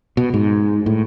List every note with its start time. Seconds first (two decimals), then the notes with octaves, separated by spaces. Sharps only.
0.17 B2
0.34 G#2
0.86 A2